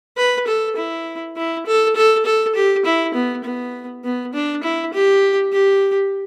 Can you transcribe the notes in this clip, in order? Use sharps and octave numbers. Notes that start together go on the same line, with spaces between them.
B4
A4
E4
E4
A4
A4
A4
G4
E4
B3
B3
B3
D4
E4
G4
G4